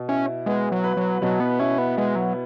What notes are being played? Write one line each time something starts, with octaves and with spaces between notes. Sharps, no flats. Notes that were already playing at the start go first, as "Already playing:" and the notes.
Already playing: B2
C#4 E4
G#3 B3
F#3
B4
F#3
B2 F#3
B3
C#4 E4
B3
G#3 B3
F#3